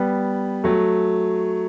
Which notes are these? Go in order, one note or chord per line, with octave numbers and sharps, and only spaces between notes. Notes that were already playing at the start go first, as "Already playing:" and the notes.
Already playing: G3 B3
F#3 A3